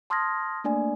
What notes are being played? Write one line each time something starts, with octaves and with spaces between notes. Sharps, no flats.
A5 C6 D#6 F6 G#6 A#6
A3 A#3 D4 D5 G#5